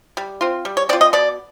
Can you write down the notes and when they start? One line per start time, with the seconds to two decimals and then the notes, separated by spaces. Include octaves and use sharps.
0.17 G3
0.41 C4 F4
0.65 G3
0.77 C#5
0.89 C4 D5
0.93 F4
1.01 D#5
1.13 B2 D5